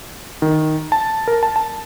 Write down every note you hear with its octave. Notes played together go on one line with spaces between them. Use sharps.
D#3
A5
A#4
A5
A5